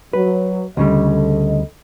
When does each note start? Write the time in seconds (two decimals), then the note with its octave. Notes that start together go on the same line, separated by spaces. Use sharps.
0.13 F#3 B4
0.77 D2 C#3 G3 A4 D#5